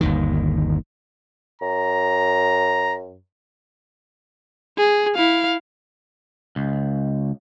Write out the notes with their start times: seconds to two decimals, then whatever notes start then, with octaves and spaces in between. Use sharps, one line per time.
0.01 G1 D#2 D#3
1.62 F#2 A#5
4.78 G#4
5.16 E4 F5
6.56 C#2